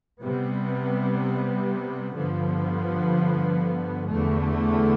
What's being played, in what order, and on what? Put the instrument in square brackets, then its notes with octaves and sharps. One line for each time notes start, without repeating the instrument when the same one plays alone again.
[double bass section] C3 G3 B3
G2 D3 F3 B3
E2 D3 A3